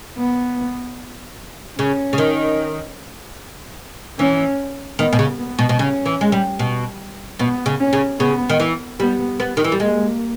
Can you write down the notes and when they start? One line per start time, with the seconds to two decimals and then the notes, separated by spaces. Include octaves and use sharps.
0.18 B3
1.79 C#3 C#4
2.13 C#3
2.18 D#3
4.18 E3 C#4
4.99 D#3 B3
5.13 B2
5.19 C#3
5.39 B3
5.59 B2
5.69 B2
5.79 C#3 C#4
6.06 E3
6.21 G#3
6.32 G3
6.59 B2
7.39 B2 B3
7.66 C#3
7.80 C#4
7.93 C#3
8.19 C#3 B3
8.50 D#3
8.60 E3
8.99 G3 B3
9.40 B3
9.57 D#3
9.64 E3
9.72 G3
9.80 G#3 A#3